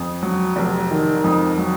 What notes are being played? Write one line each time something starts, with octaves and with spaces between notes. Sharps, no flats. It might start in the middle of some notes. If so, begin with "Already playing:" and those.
Already playing: F2
F#3
F1
D#3
F2
F#3